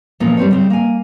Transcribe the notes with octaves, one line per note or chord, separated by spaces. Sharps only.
E2 A#2 F3 A#3 C#4 B4
G3 C4 C#5
C#3 G3 C4
A#3 G#5